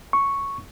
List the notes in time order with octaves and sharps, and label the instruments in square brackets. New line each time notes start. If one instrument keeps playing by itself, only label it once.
[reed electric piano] C#6